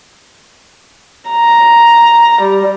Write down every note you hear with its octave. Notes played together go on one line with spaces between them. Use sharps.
A#5
G3